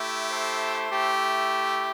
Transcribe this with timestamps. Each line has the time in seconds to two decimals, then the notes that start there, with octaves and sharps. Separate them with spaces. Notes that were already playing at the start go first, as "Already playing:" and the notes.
Already playing: A3 E4 G4
0.32 A4 C5
0.91 A3 E4 G4